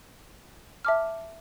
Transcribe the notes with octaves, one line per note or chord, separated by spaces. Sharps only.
E5 A5 D6 F6